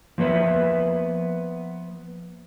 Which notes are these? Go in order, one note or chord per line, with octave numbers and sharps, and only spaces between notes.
F3 A#3 B3 B4 E5